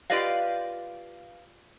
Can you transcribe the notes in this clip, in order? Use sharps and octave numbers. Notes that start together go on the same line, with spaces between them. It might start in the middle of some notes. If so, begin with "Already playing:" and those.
F4 G4 B4 D5 D#5 F5